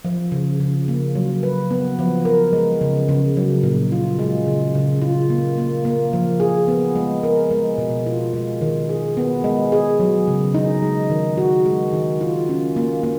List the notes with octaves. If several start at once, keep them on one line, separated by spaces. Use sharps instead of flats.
F3
C#3
C#3
A#3
F#3
B4
B3
F3
A#4
G#3
C#3
C#3
F#3
A#2
F4
G#3
C#3
C#3
F4
A#3
A#3
A#3
F3
G#4
B3
G#3
A#4
G#3
B2
F4
G#3
D#3
G#4
B3
G#3
G#4
F#3
C#3
D#4
G#3
D#3
F#4
G#3
D#3
F4
C#4
A#3
A#3